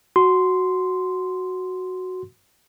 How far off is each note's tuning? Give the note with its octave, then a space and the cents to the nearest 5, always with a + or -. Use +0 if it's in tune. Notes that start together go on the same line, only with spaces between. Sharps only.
F#4 +0 C6 -5